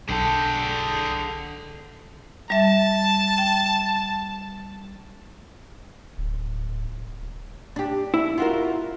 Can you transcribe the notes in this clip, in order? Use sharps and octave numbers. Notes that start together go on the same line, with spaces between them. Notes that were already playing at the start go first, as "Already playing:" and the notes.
B1 D3 G#4 A4 G5
G3 E5 A5
G5
D1
D4 G4
E4
F4 F#4 A#4